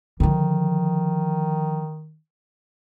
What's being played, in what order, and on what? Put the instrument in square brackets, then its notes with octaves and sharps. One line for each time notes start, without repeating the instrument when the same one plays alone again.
[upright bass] D3 F3 [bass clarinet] D#3